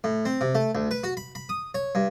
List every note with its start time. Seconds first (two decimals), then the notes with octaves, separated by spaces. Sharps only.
0.04 A2
0.25 C4
0.41 C3
0.55 A3
0.75 D2
0.91 B4
1.04 F#4
1.17 B5
1.35 B5
1.49 D#6
1.74 C#5
1.95 G2